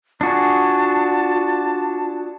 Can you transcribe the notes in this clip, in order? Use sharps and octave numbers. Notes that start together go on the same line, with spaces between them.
D4 F4 F#4 G#4 A5